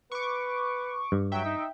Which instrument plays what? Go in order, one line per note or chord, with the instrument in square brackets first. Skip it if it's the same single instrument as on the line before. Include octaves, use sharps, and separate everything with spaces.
[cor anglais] B4 [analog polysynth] C#6 D6
[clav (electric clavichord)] G2
[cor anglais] F#3 [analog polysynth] E5 G5
[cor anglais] D#4